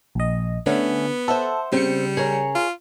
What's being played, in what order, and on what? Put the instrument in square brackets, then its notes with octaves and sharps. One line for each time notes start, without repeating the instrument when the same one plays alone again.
[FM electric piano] A#1 D#5
[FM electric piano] D3 [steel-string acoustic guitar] A3 C#4 F#5 [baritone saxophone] B3
[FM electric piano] A4 [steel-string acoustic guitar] C5 E5 F#5
[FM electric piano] C#3 C#7 [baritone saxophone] G3 [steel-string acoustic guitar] C4
[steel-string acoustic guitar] G#4 A#4 C#5
[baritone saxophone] F4